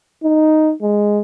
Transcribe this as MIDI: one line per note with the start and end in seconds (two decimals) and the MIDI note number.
0.24 0.73 63
0.82 1.22 56